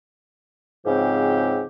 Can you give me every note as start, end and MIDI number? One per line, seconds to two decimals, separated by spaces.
0.86 1.64 44
0.86 1.64 49
0.86 1.64 53
0.86 1.64 60
0.86 1.64 67